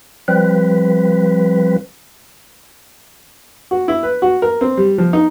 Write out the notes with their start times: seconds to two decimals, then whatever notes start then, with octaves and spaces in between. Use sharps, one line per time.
0.28 F3 G3 C4 B4
3.71 F#4
3.88 E4
4.03 B4
4.22 F#4
4.42 A#4
4.61 C4
4.77 G3
4.98 F3
5.13 D#4